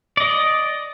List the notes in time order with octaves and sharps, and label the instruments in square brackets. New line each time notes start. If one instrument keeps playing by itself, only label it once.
[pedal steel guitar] D5 D#5